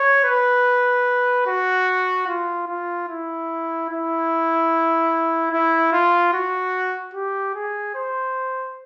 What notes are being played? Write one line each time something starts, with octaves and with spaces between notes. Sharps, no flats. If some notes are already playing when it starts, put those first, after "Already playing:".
Already playing: C#5
B4
F#4
F4
F4
E4
E4
E4
F4
F#4
G4
G#4
C5